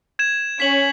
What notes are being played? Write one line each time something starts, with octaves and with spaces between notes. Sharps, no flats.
G#6 E7
C#4 B6 F#7